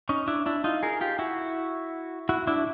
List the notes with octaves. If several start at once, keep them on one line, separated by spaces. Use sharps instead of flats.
C#4 D#4
D4 E4
D4 E4
D#4 F4
G#4 A#4
F4 G4
E4 F#4
E4 F#4
D4 E4